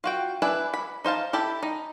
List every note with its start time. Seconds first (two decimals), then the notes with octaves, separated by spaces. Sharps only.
0.04 F4 F#4 G5
0.42 D4 E4 B4 E5 G#5
0.74 B5
1.05 D#4 C5 F5 A5
1.33 E4 G4 A4
1.63 D#4